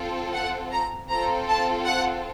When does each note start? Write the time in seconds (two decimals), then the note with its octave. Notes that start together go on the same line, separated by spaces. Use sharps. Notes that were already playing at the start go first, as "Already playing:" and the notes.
Already playing: C4 F4 A4
0.34 F#5
0.72 A#5
1.09 C4 F4 A4 A#5
1.48 A5
1.86 F#5